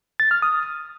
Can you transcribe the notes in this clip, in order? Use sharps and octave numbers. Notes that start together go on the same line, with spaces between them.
A6
F6
D#6